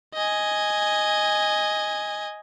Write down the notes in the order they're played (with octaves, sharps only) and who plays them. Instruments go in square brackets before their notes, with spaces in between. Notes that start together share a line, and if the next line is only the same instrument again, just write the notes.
[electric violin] D#5 G#5